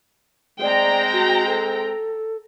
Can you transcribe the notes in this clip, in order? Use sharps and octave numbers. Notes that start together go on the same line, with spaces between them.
G#3 C4 D5 G5 A#5
F#4
A4